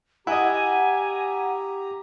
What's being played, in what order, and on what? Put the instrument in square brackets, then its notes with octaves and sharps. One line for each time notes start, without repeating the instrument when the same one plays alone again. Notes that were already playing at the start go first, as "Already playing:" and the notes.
[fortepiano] E4 D#5 [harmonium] G4 A#5 [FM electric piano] F#5 [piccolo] G#5